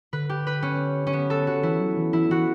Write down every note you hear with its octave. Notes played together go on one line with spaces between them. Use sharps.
D3 B4
G4
B4
C#4
C#4
B3
A4
F#4
E3 E4
F#3
E3
E3 E4
E3 F#4